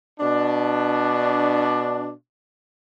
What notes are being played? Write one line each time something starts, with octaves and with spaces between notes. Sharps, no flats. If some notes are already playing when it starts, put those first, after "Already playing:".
B2 D4